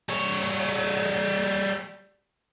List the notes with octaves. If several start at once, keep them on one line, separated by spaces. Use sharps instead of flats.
G3 C#5